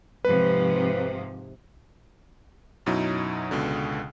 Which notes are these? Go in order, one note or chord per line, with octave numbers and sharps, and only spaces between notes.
G#2 C3 F3 B4
F#2 B2 F#3 D#4 E4
C#2 B2 D3